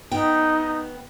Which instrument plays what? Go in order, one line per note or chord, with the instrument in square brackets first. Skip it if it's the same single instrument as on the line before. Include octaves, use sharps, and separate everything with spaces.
[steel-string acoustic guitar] B3 G5 [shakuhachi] D#4